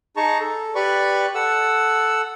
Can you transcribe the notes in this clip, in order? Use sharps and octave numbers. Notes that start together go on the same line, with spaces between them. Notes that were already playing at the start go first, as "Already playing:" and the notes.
D#4 G#4 A5 A#5 C#6
A4
G4 B4 D5 B5 C#6
A4 F#5 E6